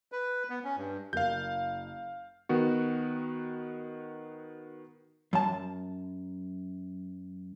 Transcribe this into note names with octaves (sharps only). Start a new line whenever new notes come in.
B4
B3
C#4
G2
F#1 A#4 F5 G6
D#3 B3 F#4
F#2 A5